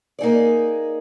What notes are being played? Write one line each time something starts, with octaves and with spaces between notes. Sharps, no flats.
A#3 D#4 G#4 D5